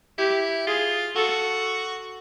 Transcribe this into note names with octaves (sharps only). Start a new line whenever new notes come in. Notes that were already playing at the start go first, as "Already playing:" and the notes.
E4 G4
F4 G#4
F#4 A4